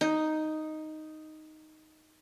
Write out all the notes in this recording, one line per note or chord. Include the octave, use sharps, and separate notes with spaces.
D#4